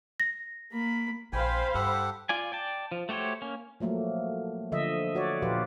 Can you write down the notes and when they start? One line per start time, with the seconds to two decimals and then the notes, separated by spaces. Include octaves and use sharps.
0.20 A#6
0.71 A#3 B5
1.33 A#1 C5 F5 G5 G#5 B5
1.74 G2 G4 A4 F#5
2.29 F4 D5 G#5
2.52 D5 G5 A5
2.92 F3
3.09 A3 F#4 G4 C5 C#5
3.42 A#3 C#4
3.80 F3 F#3 A3 A#3
4.72 D3 F3 D#5 E5
5.15 F#4 C#5 D5
5.42 A#2 F3 F4 G4 B4